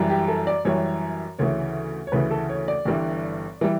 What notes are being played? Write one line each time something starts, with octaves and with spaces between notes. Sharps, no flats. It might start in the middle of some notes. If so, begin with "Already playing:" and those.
Already playing: F#2 E3 G3
G4
A4
D5
F#2 E3 G3 C#5
D2 C#3 E3 C#5
C#5
D2 C#3 E3 B4
A4
C#5
D5
G1 G2 E3 G3
E3 G3